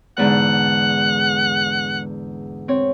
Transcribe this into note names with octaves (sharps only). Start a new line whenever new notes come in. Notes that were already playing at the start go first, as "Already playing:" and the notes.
E2 G#2 D3 F#5
C4 C#5